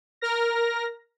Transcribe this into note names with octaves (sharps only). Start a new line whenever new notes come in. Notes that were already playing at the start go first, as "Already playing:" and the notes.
A#4 F6 A#6